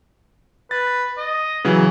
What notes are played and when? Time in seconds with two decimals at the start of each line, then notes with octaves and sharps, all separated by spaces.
0.71 B4 A6
1.18 D#5
1.64 C#3 E3 F#3